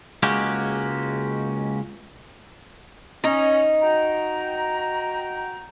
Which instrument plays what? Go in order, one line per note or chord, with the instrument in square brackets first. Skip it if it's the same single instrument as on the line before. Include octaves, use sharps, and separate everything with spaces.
[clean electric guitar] C#2 G#3 A#3 C#4 F#4 G4
[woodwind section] C#4 [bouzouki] D#4
[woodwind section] F#4 G5 A#5